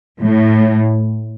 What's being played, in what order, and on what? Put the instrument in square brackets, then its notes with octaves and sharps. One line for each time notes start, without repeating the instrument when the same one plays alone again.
[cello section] A2